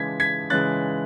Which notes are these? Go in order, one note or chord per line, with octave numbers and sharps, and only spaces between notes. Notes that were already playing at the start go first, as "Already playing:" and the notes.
Already playing: C#3 E3 G#3 G#6 B6
G#6 B6
C#3 E3 G#3 F#6 A6